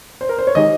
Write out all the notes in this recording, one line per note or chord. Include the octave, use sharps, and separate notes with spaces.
C5
A#4
C5
C#5
D#3 G#3 D#4 G4 D#5